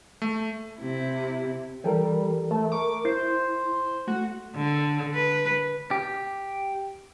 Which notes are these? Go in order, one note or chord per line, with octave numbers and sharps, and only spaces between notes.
A3
C3 E4
E3 G3 A4 A#4
A3
A#4 C#6 D6
E4 C5
A3 F#4
D3
B4
G4